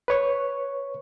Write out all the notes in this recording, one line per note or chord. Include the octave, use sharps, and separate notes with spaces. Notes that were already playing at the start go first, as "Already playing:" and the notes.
B4 C#5 C#6